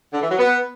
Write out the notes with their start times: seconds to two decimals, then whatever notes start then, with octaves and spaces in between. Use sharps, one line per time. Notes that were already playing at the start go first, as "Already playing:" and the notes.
0.13 D3
0.21 E3
0.30 F#3
0.38 B3